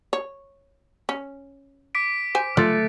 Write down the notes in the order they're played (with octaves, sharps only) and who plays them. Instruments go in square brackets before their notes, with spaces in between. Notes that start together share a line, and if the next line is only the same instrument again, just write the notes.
[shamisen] C#5
C#4
[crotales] D6 B6 D7
[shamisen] C5 G#5
[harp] A3 [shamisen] F4 [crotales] F#6 A6 C#7